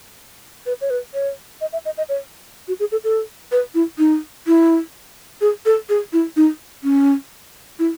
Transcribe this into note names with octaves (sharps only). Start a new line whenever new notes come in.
B4
C#5
B4
C#5
D#5
E5
D#5
D#5
C#5
F#4
G#4
A4
A4
B4
E4
D#4
E4
G#4
A4
G#4
E4
D#4
C#4
E4